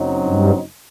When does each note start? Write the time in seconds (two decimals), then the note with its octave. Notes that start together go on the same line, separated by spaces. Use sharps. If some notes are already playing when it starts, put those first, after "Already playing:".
Already playing: F#1 F#2 F#3 C4 D#4
0.25 G2